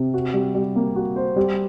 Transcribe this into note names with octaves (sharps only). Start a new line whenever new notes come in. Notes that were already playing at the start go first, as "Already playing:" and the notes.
Already playing: C3
F#4
G3
G3
A#3
F#4
C5
G3